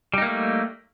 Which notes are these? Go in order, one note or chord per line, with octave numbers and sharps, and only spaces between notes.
G3 A3 A#3 D#4